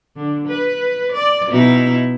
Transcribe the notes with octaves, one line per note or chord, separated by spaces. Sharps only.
D3
B4
D5
B2 D#4 E4